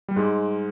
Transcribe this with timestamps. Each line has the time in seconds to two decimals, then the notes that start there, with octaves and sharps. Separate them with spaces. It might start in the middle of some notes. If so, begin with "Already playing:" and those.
0.08 G3
0.16 G#2 G#3